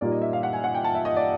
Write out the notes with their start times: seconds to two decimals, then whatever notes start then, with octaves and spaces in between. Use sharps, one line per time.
0.01 A#2 G3 A#3 D#4 D5
0.12 D#5
0.22 E5
0.33 F5
0.43 F#5
0.53 G#5
0.64 F#5
0.75 G5
0.84 A5
0.95 E5
1.05 D#5
1.16 D5